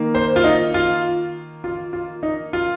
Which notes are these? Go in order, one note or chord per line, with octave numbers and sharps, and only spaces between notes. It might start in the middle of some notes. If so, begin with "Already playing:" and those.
Already playing: D#3 A#3
C5
F4
D#4
F4
F4
F4
D#4
F4